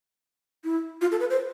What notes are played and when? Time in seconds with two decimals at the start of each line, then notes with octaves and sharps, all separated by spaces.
0.64 E4
1.01 F4
1.12 A4
1.20 B4
1.30 C5